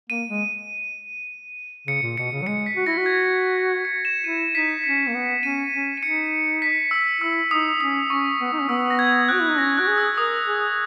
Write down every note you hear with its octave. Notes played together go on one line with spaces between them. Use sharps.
A#3 D#7
G#3
C#3 C#7
A#2
B2 C#7
C#3
F#3
G#3 C#7
B6
F#4
E4 A#6
F#4
G#6
C#7
E7
E4 D#7
D#4 B6
C#4 C#7
A#3
B3
C#4 D#7
C#4
D#7
D#4 C#7
B6
E6
E4 E6
D#4 D#6
C#4 D#6
C#4 C#6
B3
D#4
C#4
B3 E6
A#6
G#6
F#4 F#6
E4
D#4
C#4 A#6
F#4 F#6
G#4
E6
A#4 D#6
G#4